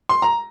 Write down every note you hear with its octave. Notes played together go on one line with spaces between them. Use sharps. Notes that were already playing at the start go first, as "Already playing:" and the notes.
C6
A#5